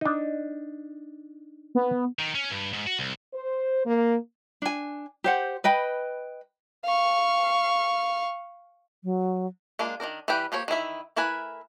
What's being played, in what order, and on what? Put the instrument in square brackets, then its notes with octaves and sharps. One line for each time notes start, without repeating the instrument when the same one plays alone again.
[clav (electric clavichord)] D4 D#4
[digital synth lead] B3
[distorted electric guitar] D#3
C#4
G2
G#2
F#4
C2
[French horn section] C5
A#3
[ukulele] D4 G#5
G4 C5 F#5
B4 D#5 G5 B5
[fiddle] F5 C#6
[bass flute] F#3
[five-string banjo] G#3 A#3 D4 F4
D#3 G#3 D4 A#4
E3 G3 G4 B4 G5
F3 A#3 G4 C#5
D#3 E3 E4 E5
A3 E4 A#4 B4 G#5